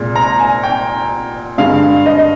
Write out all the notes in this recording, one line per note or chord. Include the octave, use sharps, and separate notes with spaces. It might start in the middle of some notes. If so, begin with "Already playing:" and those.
Already playing: C2 A#2 G#3
A#5
G#5
G5
G2 D3 G#3 F5
D#5